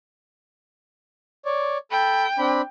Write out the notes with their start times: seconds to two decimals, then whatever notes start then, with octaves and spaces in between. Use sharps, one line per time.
1.45 C#5 D5
1.91 A4 G5 B5
2.38 C4 D4 B5